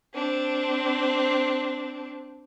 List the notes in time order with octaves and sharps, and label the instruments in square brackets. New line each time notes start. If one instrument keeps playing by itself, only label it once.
[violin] C4 D4